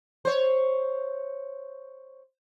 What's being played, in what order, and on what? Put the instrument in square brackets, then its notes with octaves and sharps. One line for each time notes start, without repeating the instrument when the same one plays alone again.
[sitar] C5 C#5